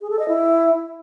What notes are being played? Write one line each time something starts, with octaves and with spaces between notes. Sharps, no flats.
G#4
A4
D#5
E4